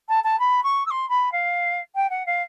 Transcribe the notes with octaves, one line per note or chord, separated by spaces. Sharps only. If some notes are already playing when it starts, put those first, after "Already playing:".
A5
A5
B5
C#6
E6
C6
B5
F5
G5
F#5
F5